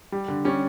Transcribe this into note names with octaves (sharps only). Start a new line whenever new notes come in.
G3
D3
G3 C#4